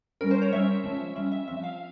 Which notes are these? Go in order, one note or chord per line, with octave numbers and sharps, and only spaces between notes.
G3 C#4 A#4
C5
C#5
G3 C#4 E5
F3 G#3 C#4
G3 C#4 E5
E5
F3 C4 E5
F5